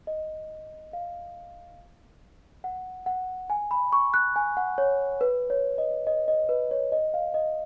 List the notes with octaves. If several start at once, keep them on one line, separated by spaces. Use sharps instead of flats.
D#5
F5
F#5
F#5
G#5
B5
C#6
F#6
G#5
F#5
C#5
B4
C#5
D#5
D#5
D#5
B4
C#5
D#5
F5
D#5